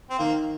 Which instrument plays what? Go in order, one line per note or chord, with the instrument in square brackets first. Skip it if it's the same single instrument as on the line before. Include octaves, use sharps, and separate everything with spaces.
[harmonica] C4
[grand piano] D#3 [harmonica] A#3